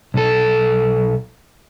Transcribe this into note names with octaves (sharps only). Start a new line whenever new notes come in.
B1 A4